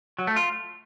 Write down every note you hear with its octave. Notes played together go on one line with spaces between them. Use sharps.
F#3
A3
F4